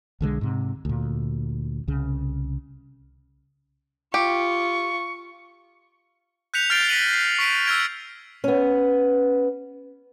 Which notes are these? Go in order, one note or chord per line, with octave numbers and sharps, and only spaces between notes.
B1 D3 F#3 G#3
G#2 C3
D2 A#2
C2 C#3
F4 G4 C#6
F#6 G6 B6 C#7 F7
F6 G6 A6 C7 D7 G7
A#6 B6 C#7 D#7 F#7
C7
C#6 B6 D7 D#7
E6 F6 G#6 D7
B3 C#4